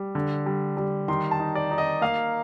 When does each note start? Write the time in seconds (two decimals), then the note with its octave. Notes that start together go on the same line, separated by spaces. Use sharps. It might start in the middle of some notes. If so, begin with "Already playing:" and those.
Already playing: G3
0.15 D3
0.46 G3
0.77 G3
1.08 D#3 C6
1.31 A5
1.40 D#4
1.55 D5
1.71 D#4
1.78 D#5
2.01 A#3 F5